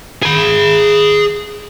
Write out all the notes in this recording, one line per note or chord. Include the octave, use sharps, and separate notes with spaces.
G#4 B5